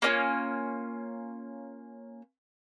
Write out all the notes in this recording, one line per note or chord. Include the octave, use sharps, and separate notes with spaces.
A#3 C#4 F4